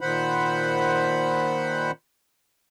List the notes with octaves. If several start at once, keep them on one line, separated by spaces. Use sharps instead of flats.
A#2 D#3 C5 F#5 B5